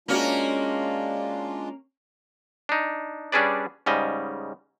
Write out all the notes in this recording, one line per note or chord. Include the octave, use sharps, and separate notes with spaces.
G#3 A#3 C#4 D4 F4 F#4
D4 D#4
G3 C#4 D4 G#4 B4 D5
G#2 C#3 G3 D#5